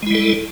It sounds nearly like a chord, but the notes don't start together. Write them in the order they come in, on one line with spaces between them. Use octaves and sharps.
G#3 E4 G3 A4